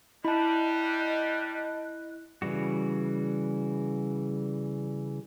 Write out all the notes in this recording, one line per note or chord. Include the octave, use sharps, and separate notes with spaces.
G3 E4 D#5 A5 B5 F#6
C#3 E3 G3 F#4